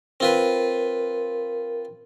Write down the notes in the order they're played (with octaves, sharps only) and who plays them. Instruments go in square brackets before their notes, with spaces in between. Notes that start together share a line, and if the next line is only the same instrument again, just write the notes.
[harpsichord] C4 F4 B4 [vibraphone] A#4